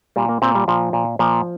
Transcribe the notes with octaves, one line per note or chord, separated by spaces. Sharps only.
A#2 G3
A#3
A#2 C4
G3
A#2 F3
A#2
A#2 F3